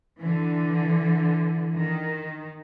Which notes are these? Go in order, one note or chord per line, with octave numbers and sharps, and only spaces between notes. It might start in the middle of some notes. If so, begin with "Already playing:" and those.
D3 E3
D#3